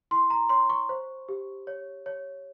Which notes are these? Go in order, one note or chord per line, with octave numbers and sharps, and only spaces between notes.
E4 C6
A#5
C#5 C6
C#6
C5
G4
C#5
C#5